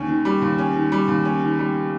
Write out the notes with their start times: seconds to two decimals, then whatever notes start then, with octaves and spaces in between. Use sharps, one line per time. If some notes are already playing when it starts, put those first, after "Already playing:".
Already playing: D#2 C#4
0.08 D#3
0.25 G3
0.42 D#2
0.58 C#4
0.75 D#3
0.92 G3
1.08 D#2
1.25 C#4
1.42 D#3
1.59 G3